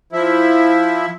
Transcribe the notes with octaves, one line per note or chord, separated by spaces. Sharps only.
F3 E4